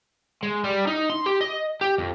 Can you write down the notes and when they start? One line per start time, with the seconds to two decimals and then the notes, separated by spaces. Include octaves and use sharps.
0.43 G#3
0.64 G3
0.87 D#4
1.10 C6
1.26 G4
1.41 D#5
1.81 G4
1.98 F2